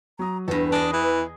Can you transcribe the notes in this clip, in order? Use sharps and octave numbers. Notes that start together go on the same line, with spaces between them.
F#3 A#5 D#6
E2 G2 B3 A4 B4 A#6
D4 G#4 D#5
E3